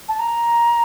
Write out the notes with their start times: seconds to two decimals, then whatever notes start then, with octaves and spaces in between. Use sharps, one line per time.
0.08 A5
0.19 A#5